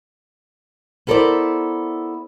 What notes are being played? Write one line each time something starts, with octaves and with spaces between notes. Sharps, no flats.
B3 E4 A4 A#4 C5 D5